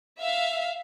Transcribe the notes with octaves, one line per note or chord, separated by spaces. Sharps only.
E5 F5